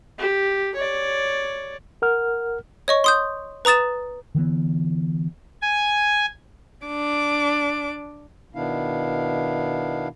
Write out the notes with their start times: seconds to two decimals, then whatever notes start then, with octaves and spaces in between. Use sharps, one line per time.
0.18 G4
0.75 C#5 D5
2.02 A#4 F#5 F6
2.88 C#5 D#5 C#6
3.04 C6 D#6 G6
3.65 B4 A#5 D#6 A6 E7
4.35 D3 E3 G3 B3
5.62 G#5
6.86 D4 D6
8.55 B2 D#3 B3 D4 E4 F5